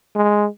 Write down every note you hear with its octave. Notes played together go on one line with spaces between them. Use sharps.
G#3